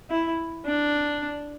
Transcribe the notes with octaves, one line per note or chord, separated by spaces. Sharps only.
E4
D4